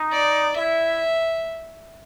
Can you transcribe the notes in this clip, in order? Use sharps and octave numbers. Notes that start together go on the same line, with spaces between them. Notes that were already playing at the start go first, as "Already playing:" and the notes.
Already playing: D#4
D5
E4 E5